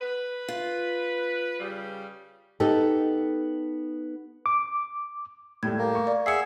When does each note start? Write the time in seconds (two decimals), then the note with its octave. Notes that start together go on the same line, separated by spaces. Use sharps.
0.01 B4
0.48 F4
1.60 C#3 G3
2.60 B3 D#4 G4 A4
4.46 D6
5.63 A2 G3 A3 G#6
5.78 A#3
5.95 C#6
6.07 D5 F5
6.26 G#4 E5 F#5 C7 C#7